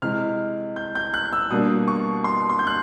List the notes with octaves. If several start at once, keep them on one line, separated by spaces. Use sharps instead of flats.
C3 E3 G#3 F6
G6
G6
F#6
E6
B2 G3 A#3 D4 D#6
C#6
C6
C6
G6
F#6